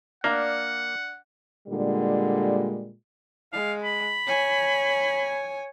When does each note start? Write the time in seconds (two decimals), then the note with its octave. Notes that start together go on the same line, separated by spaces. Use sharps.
0.24 A#3 D4 D5 F5 F#5 A#5
1.68 A#2 D3 G3 G#3
3.53 G#3 F5
3.84 B5
4.27 C#5 G#5